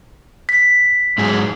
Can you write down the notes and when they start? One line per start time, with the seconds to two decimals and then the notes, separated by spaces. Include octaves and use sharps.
0.49 B6
1.18 G#2 F#3 G#4